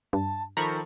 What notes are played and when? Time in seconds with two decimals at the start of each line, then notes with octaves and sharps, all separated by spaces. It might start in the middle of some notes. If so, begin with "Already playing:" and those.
0.13 G2 A5
0.57 D#3 F3 A4 C5 A#5 B5 C#6